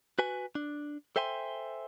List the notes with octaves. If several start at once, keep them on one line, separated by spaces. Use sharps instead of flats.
F#4 B4 G#5
D4
A4 C5 E5 G5 G#5 C6